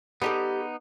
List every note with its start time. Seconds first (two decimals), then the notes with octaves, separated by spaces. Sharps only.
0.22 G3 B3 D#4 G4 A4